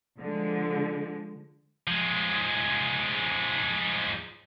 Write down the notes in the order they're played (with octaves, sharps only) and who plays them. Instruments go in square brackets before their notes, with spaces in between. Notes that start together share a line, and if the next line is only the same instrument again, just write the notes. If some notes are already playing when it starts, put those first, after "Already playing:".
[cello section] D3 F3 G#3
[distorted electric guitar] F3 G#3